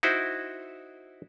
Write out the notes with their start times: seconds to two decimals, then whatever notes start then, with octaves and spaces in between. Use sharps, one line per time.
0.03 D#4 E4 F#4 C5